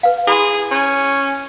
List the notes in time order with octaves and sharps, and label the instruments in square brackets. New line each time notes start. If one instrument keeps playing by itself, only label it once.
[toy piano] B4 F5
[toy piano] E4 B5 C6 [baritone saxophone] G#4
[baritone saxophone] C#4